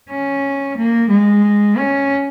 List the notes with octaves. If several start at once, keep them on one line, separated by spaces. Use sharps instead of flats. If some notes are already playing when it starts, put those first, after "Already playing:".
C#4
A#3
G#3
C#4